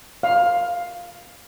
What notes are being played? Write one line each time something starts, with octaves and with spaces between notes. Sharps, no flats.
F5